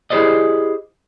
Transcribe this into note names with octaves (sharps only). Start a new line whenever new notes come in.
E4 G4 G#4 C5 D5 D#5